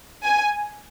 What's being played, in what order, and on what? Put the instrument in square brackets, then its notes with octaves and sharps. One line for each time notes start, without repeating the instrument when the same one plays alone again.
[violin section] G#5